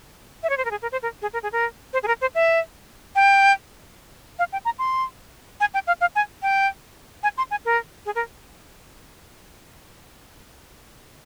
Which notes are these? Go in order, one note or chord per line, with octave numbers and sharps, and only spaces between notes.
E5
C#5
C5
A#4
G#4
A#4
C5
A#4
G#4
A#4
G#4
A#4
C5
G#4
A#4
C5
E5
G5
F5
G5
A#5
C6
G#5
G5
F5
F5
G#5
G5
G#5
C6
G#5
A#4
G#4
A#4